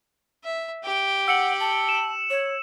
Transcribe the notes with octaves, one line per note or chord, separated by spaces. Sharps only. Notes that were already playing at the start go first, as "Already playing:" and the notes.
E5
G4 G5
F#5 E6 C#7 F#7
A5
E7
C#5